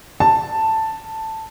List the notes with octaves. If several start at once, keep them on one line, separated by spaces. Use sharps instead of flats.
A5